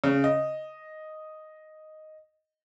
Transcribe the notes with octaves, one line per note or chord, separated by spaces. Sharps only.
C#3
D#5